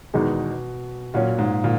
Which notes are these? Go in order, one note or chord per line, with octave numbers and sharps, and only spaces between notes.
E2 B2 D#3 G#3 D#4 G#4
A#2 F#3 C#4 F#4
G#2
A#2